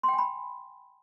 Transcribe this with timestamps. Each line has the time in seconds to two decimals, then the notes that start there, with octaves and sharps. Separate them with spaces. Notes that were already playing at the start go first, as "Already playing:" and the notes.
0.03 C6
0.08 G5
0.13 G#5
0.18 B5